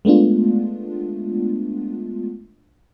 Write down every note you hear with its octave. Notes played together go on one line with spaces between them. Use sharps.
G#3 A3 B3 D4 F4